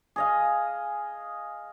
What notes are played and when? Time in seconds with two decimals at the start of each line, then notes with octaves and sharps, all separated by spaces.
0.16 G#4 D#5 F5